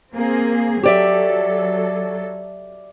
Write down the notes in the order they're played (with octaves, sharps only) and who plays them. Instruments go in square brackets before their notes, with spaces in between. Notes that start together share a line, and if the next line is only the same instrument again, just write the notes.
[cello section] A#3 C4 G#4
[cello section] F#3 A4 [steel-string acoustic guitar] G4 D5 E5